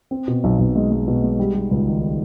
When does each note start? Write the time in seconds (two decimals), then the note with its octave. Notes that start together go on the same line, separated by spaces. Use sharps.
0.11 C4
0.28 B2
0.44 B1
0.59 B1
0.76 G#3
0.92 G#3
1.08 B2
1.22 G#3
1.39 G3
1.55 G3
1.71 C#2
1.87 D#3